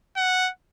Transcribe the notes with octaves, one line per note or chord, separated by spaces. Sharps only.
F#5